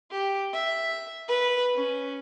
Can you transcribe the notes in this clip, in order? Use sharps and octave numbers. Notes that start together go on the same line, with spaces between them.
G4
E5
B4
C#4